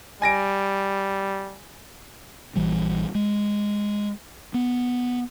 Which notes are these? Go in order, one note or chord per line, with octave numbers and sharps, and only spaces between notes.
G3 G#5 A#6 D7
A#1 E3 G3
G#3
B3